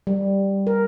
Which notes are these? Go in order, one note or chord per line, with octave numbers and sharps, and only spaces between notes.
G3
A#4